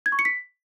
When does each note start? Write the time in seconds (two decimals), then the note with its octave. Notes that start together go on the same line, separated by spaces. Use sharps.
0.06 G#6
0.12 C#6
0.19 C#7
0.25 B6